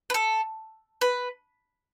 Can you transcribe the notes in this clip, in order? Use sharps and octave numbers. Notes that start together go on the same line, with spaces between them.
B4
A4
B4